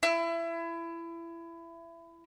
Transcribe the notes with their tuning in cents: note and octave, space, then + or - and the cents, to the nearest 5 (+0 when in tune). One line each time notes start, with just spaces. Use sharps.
E4 +25